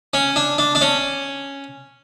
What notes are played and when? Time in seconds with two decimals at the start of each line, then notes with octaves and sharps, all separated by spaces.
0.14 C#4
0.36 D4
0.58 D4
0.75 D4
0.81 C#4